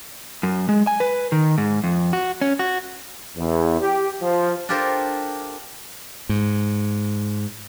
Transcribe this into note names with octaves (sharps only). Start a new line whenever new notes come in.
F#2
G#3
G#5
B4
D#3
G#2
F2
F#4
C#4
F#4
E2
G4
F3
D4 F4 G4 A4 A#4 C5
G#2